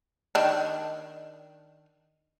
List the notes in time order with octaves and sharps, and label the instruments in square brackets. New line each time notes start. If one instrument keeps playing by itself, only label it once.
[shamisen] D#3 D4